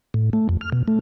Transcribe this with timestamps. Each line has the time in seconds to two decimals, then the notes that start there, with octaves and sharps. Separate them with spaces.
0.14 A2
0.33 A3
0.49 F2
0.61 F6
0.72 B2
0.88 A3